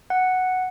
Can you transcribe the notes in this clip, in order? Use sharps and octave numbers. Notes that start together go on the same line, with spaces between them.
F#5